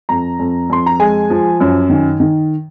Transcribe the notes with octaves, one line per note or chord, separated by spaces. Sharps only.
F2 A#5
F2
F2 C6
A#5
G#3 G#5
F3
F#2
D#3
D#3